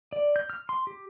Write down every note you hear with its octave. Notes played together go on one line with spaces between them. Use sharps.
D5
G6
F6
C6
G4